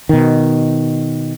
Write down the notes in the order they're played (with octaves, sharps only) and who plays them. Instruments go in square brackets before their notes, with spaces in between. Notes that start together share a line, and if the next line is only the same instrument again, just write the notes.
[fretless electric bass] B2 D#3